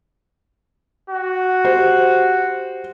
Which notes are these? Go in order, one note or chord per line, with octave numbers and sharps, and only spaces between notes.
F#4
G4 C5